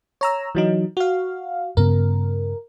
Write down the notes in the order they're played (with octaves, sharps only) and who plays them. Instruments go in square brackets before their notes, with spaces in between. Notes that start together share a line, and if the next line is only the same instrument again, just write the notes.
[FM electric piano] C#5 A#5 E6
E3 F#3 D#4
F#4 F5
[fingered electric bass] G2 C#3 B3 [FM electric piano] A#4